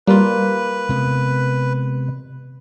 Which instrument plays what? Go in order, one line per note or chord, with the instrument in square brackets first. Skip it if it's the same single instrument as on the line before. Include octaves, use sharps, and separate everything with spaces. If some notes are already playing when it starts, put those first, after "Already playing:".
[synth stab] G3 [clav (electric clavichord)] A#3 F4 [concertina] B4
[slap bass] C3 G#3 B3